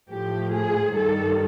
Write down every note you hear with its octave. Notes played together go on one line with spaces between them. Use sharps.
A2 F3 A3 G4
G#4
G2 D#3 G3 A4